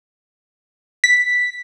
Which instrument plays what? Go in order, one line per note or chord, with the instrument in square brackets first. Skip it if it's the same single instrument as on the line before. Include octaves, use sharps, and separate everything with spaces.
[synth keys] B6